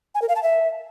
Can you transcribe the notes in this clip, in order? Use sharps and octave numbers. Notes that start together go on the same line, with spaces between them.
G#5
A#4
F5
A5
E5